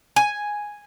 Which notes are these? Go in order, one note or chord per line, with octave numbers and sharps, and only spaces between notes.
G#5